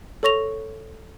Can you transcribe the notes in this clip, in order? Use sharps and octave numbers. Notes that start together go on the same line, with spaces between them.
A4 C#5 C#6 A#6 F7